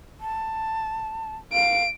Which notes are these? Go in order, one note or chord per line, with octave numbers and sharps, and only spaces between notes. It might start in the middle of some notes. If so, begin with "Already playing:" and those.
A5
F5 D7